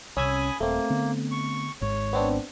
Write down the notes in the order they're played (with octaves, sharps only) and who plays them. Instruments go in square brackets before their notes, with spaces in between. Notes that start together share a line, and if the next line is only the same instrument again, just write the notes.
[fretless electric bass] C2 C3 [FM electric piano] C#4 E6 G#6 [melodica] G#5 B5 D#6
[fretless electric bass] D#1 [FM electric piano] A3 C4 [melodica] A#3
[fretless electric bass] D3 B3
[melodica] C#6
[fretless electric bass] G#1 G#2 [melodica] C#5
[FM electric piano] B3 C4 D4